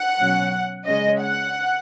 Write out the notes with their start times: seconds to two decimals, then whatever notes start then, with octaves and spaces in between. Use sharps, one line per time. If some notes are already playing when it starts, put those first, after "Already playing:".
Already playing: F#5
0.20 B2 F#3 C#4
0.86 C#3 G#3 C#4 D#5
1.21 F#5